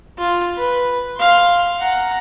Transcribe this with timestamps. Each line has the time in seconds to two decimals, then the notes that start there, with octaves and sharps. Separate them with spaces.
0.18 F4
0.58 B4
1.16 F5 C6
1.79 F#5 A#5